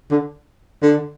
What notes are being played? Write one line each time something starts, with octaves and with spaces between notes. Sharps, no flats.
D3
D3